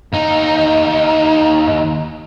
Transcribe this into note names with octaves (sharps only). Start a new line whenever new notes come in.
D#2 D#4